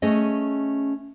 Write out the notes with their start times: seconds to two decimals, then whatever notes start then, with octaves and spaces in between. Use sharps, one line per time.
0.02 A3 C#4 G#4 D#5